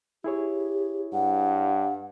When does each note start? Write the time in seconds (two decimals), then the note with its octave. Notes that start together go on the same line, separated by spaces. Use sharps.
0.24 E4 G4 G#4 C#5
1.13 G2 F#5